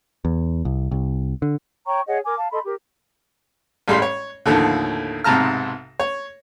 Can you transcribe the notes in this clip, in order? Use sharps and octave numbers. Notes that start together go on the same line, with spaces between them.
E2
C2
C2
D3
C#5 G5 A#5 C#6
G#4 C#5 D#5 F#5
A#4 G#5 D6
F5 A5
A4 D#5 B5 C6
G4 A#4
A1 A2 G3 G#3 F5 C6
C#5
D#2 A2 D3 D#3 F3
B1 G#2 C3 A5 A#5 F6
C#5